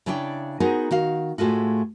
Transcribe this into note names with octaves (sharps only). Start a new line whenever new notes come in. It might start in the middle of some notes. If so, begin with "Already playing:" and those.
C#3 D4 E4 C#5 D5 G5
B3 D#4 F#4 G#4 A#4 C5
D#3 F#4 F5
A2 G#3 A3 F4 F#4